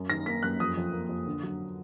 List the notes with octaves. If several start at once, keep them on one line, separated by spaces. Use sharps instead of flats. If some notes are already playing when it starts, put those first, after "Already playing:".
Already playing: F#2
D#3 A#6
A#3 B6
F#2 F#6
F2 D#6
F2
A#3
F2
D3
F#3